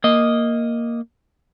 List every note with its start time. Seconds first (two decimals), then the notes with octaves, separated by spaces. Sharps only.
0.04 A#3 D#5